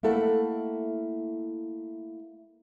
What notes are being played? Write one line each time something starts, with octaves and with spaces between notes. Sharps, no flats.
A3 A#3 E4 A4 F#5